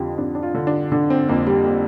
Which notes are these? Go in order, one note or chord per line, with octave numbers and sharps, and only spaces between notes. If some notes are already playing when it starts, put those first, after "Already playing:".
Already playing: F2 D3 F4 G4
F2 D4
D4
F4
D3
D4
D3 D4
C4
F2 A#3
G3
A#3